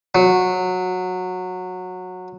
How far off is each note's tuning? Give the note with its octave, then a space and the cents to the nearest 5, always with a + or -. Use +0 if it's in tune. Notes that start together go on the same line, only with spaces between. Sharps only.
F#3 -15